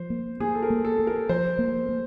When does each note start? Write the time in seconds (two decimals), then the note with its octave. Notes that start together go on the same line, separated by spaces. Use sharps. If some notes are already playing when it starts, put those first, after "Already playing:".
Already playing: F3 C5
0.10 A#3
0.40 A#3 G#4
0.55 A4
0.62 A#4
0.70 A#3
0.85 A4
0.99 A#3
1.07 A#4
1.29 F3 C5
1.59 A#3
1.89 A#3